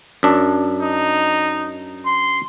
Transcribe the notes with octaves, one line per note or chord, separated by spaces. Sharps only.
F#2 D4
D#4
C6